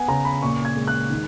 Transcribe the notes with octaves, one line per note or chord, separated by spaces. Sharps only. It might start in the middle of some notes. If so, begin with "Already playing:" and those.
Already playing: B3 F#5 G#5
C#3 A#5
B5
A#2 C#6
G#6
G#3
F#6
D#3